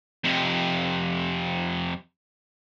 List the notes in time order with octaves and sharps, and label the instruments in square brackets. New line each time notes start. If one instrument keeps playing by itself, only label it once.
[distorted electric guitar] F2 C3